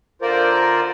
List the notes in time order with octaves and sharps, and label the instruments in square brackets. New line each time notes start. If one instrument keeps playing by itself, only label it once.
[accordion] D3 F4 A#4 C5 D5